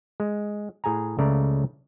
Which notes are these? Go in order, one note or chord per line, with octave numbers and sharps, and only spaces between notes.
G#3
A2 G#4 G#5 A#5
C#2 C#3 A3 D5 A#5